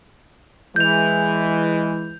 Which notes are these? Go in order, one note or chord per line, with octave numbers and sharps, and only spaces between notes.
E3 G#3 G6 F7